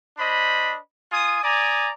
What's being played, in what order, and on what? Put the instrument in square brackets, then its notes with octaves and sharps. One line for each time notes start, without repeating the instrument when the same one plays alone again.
[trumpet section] D4 C5 D#5 B5
F4 G#5 D#6
D5 G#5 A#5 D6 D#6